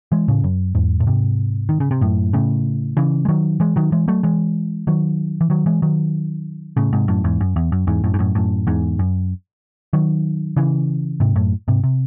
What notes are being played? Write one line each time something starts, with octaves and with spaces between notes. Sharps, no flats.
E3 G#3
A2 C#3
F#2
E2 G#2
A2
G#2 C3
D#3
C#3
C3
F#2 A2
A2 C#3
C#3 E3
G#3
D#3 F#3
E3 G#3
D#3 F#3
E3 G#3
F#3 A3
E3 G#3
D#3 F#3
E3
D#3 F#3
E3 G#3
D#3 F#3
A2 C#3
G#2 C3
F#2 A2
E2 G#2
F#2
E2
F#2
E2 G#2
F#2 A2
G#2
F#2 A2
F#2 A2
E2 G#2
F#2
D#3 F#3
C#3 E3
G#2 C3
F#2 A2
G#2 C3
C3